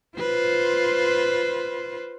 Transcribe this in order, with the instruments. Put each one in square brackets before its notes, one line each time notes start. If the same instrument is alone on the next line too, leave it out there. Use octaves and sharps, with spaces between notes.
[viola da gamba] F4 B4 C5